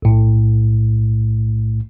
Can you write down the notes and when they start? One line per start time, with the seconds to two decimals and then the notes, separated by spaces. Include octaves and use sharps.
0.02 B1 A2